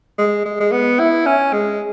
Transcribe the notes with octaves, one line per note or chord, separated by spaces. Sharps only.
G#3
G#3
G#3
B3
E4
C#4
G#3